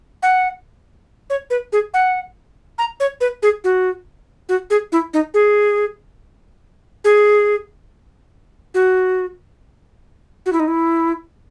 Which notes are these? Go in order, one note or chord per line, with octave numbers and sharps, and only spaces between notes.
F#5
C#5
B4
G#4
F#5
A#5
C#5
B4
G#4
F#4
F#4
G#4
E4
D#4
G#4
G#4
F#4
F#4
E4
D#4
E4